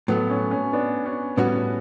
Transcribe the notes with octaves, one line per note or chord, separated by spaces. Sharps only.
A2 F#3 A3 B3
C#4
C#4
B3 D4
C#4
A2 G3 B3 C#4 F#4